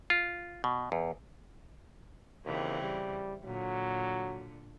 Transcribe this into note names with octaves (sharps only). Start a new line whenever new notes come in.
F4
B2
E2
D#2 C#3 E3 C4
G3
A#2 D3 F#3